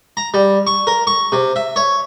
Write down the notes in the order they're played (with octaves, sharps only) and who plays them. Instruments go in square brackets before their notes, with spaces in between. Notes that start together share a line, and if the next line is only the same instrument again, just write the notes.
[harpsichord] A#5
G3
C#6
A#4
C#6
C3
E5
C#5